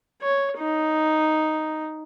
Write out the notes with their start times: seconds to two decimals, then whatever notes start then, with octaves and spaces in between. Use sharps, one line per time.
0.22 C#5
0.59 D#4